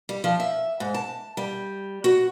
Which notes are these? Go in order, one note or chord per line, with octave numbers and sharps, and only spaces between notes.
G3
F3
E5
G#2
A5
G3
F#4